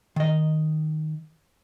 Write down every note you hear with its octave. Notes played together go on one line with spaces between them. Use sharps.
D#3 D#5